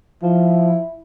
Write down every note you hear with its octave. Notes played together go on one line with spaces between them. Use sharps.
F3 E4